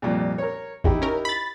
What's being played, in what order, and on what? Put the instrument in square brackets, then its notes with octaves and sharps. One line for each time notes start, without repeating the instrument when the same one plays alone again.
[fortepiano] C2 F2 A#2
A#4 C#5
[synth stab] A1 E2 [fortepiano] D#4 E4 G4
[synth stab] C#4 A#4
B5 A6